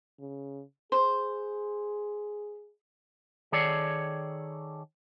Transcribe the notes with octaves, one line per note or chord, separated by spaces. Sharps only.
C#3
G#4 C5
D#3 G#4 A4 C#5 D5